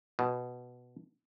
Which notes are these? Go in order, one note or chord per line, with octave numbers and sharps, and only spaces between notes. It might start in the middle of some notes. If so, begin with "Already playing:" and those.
B2